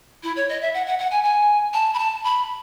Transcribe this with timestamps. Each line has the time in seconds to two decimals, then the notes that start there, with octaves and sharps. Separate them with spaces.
0.23 E4
0.36 C#5
0.49 D#5
0.61 E5
0.74 F#5
0.87 F#5
0.99 F#5
1.11 G#5
1.24 G#5
1.73 A5
1.94 B5
1.99 A5
2.24 B5